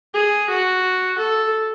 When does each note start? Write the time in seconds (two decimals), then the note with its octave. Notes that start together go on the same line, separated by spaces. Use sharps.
0.14 G#4
0.50 F#4
1.19 A4